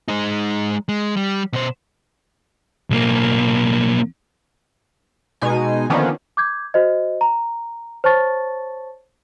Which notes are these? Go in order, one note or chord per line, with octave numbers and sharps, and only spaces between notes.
G#3 D#4
G#3
G3
B2 C5
B1 A#3
B2 G#3 D#4 G#5
D3 D#3 F3 A#3 B3 C#4
D6 G6 G#6
F#4 C5 D#5
A#5
C5 C#5 A5 C#6 A6